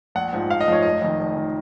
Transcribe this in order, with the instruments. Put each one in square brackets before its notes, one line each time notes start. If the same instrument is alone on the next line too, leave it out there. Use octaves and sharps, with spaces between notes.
[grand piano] A#1 F#5
G#2 F3
A#1 F5
D#5
G#2 F3 C#5
F1 D#5
F2 D#3
F1
D#3